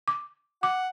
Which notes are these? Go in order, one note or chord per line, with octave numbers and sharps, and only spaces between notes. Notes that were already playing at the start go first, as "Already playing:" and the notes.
D6
F#5 D6